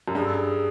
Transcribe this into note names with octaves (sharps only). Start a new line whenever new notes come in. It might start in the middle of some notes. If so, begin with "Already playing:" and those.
F#2
G2 G#4
A4
G#4